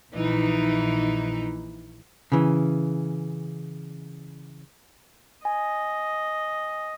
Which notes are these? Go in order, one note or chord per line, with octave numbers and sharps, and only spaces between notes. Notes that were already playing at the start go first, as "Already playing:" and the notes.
A#1 E3 D#4
C#3 E3
D#5 G#5